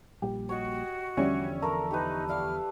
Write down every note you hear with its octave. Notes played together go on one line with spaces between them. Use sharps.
A#1 A#2 G3 G4
F#4 C#5 D#5
E2 D3 F3 G3 C#4 D5 E5 C#6
A3 A4 A#4 A#5
D#4 G4 B4
G3 E4 F5 F6